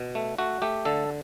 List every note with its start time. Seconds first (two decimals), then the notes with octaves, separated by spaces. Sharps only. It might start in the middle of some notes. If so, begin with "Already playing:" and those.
Already playing: B2
0.15 A3
0.38 A3 F#4
0.62 A3 G4
0.85 D3 A4